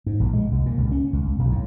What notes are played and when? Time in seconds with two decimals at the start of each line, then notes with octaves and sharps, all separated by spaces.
0.06 G#2
0.20 A#1
0.33 G#3
0.51 C2
0.66 A#2
0.78 C#2
0.92 C#4
1.13 C#2
1.26 C#2
1.39 B1
1.52 A2